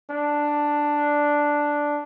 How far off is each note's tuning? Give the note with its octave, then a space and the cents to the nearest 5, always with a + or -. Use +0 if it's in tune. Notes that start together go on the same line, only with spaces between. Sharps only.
D4 +0